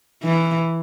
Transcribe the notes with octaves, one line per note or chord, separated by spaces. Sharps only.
E3